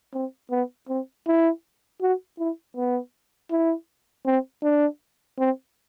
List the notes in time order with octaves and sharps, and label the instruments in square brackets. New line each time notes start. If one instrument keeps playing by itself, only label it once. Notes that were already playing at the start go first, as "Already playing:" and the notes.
[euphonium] C4
B3
C4
E4
F#4
E4
B3
E4
C4
D4
C4